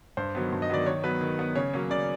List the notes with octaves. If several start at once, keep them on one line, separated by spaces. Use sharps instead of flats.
G2 C5
D#3 F#3 B3
G2
D#5
D#3 F#3 B3 D5
D#3 C#5
F#3 B3 B4
D#3
F#3 B3
C#3 C#5
F#3 A#3 C#4
C#3 D5